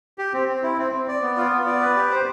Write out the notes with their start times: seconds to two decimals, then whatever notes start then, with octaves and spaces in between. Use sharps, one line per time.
0.18 G4
0.33 C4
0.48 C4
0.63 E4
0.78 C4
0.92 C4
1.08 D5
1.22 B3
1.37 F4
1.52 B3
1.66 D5
1.81 B4
1.96 G4
2.11 C5